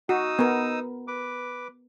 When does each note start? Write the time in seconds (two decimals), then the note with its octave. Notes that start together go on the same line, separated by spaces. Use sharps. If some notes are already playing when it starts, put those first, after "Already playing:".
0.09 D#4 F#4 D#6 E6
0.39 B3 A#4
1.08 B4 D6